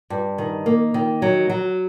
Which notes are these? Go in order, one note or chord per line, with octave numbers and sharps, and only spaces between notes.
G2
D#3
A#3
D#3
F#3
F#3